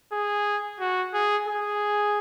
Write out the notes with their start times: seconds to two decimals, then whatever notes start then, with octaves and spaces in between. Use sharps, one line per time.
0.12 G#4
0.80 F#4
1.14 G#4
1.48 G#4